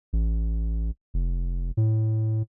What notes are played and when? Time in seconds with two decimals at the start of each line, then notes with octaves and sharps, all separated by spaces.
0.13 A1
1.14 F1
1.77 A2